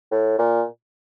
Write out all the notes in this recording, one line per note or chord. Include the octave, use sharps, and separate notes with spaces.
A2
A#2